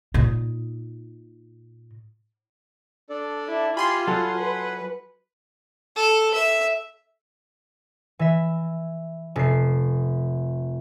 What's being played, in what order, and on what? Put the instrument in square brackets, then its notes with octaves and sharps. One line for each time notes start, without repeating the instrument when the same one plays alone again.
[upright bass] A#2 D#4
[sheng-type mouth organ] D4 A4 D5
[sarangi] E4
[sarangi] F4 [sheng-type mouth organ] G4 G#5 [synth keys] B5 C6 C7
[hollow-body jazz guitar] F#3 A4 [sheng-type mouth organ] F#5 G#5
[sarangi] B4
[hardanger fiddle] A4
E5
[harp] E3 E5
F1 C7